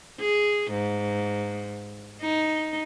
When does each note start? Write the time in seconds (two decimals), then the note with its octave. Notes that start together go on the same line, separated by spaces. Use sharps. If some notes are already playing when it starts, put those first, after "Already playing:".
0.20 G#4
0.72 G#2
2.21 D#4